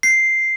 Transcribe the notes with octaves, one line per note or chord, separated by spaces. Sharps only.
C7